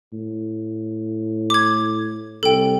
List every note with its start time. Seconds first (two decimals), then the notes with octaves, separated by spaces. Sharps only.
0.13 A2
1.50 D6 G#6
2.43 C2 A4 G5